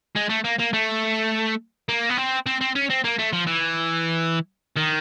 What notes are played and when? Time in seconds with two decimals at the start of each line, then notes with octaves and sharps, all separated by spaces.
0.16 G#3
0.29 A3
0.44 A#3
0.59 A#3
0.73 A3
1.89 A#3
2.10 B3
2.18 C4
2.46 C4
2.61 C4
2.75 C#4
2.90 C4
3.04 A#3
3.19 A3
3.33 F3
3.47 E3
4.77 D#3